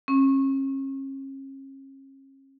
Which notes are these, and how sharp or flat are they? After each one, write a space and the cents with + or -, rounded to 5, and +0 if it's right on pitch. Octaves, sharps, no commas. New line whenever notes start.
C#4 -40